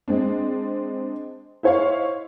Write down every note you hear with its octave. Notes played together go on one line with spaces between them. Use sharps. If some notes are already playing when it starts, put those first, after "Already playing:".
G#3 C4 D4
E4 C5 C#5 D#5 F5